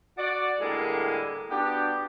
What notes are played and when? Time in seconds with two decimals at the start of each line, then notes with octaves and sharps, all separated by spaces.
0.18 F#4 D5
0.60 A2 D3 G3 G#3 A#3
1.51 B3 D4 F#4 G4